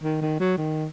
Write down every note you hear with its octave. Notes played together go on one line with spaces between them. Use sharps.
D#3
D#3
F#3
D#3